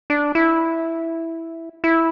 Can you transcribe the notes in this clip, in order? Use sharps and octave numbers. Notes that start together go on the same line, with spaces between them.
D4
E4
E4